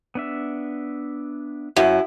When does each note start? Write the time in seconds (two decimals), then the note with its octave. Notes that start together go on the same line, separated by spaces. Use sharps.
0.15 B3 D4 E5
1.76 F#2 E4